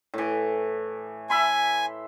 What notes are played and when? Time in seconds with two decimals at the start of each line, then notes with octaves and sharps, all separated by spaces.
0.14 A2 E3
1.30 E5 G#5 B5 C6